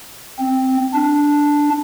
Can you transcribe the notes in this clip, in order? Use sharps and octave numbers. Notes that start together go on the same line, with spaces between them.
C4
D4